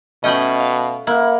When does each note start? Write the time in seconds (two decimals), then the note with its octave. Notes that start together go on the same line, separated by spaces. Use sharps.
0.24 B2 A3 C#4 D#5 G5 B5
0.60 F5
1.07 A#3 E4 F#5